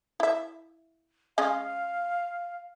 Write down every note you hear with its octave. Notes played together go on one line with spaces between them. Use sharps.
E4 E5
G#3 C#4 D#5 F5